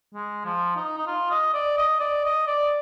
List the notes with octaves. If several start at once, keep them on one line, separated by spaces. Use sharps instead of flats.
G#3
F3
D#4
D#4
F4
D#5
D5
D#5
D5
D#5
D5